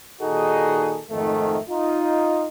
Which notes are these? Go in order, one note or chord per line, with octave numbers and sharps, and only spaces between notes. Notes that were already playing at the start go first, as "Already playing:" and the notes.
A#2 D#3 D#4 F#4 G#4 A4
F2 G#2 D#3 A3
D#4 F4